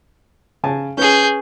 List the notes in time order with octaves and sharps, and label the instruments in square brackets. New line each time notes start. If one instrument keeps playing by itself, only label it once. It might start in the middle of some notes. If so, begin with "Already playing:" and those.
[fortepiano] C#3 G#5 A5
[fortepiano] C#4 B4 [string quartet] G#4 G6